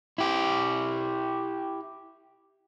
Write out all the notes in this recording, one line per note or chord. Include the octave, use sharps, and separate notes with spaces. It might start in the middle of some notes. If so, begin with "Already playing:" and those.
E4 G4